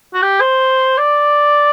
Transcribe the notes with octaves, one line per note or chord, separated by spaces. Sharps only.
F#4
G4
C5
D5